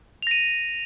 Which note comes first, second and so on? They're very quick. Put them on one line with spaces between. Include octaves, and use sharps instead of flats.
F7 A#6 D#7